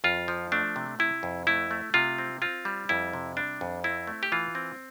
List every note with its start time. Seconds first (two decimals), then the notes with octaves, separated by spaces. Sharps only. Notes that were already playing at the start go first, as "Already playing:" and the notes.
0.04 F2 F4
0.28 F3
0.52 A3 D4
0.76 C3
0.99 C3 E4
1.23 F2
1.47 A3 E4
1.71 A3
1.94 C3 F4
2.18 C4
2.42 C4 F4
2.65 G3
2.89 F2 E4
3.13 C3
3.37 G3 D4
3.61 F2
3.84 C4 E4
4.07 A3
4.23 G4
4.32 E3 F4
4.55 C4